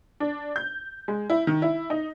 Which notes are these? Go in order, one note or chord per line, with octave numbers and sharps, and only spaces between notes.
D4
G6
G#3
E4
D#3
E4
D#4